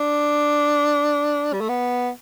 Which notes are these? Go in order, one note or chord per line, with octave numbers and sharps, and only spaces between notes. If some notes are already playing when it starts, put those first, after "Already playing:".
Already playing: D4
G3
A3
B3